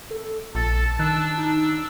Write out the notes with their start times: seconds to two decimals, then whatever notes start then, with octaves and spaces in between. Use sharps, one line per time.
0.11 A4
0.55 A#1 A4 A5 A6
0.99 D#3 D4 E6 F#6
1.38 D#4